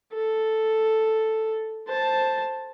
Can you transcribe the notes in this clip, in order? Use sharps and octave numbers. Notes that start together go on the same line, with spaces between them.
A4
C5 A5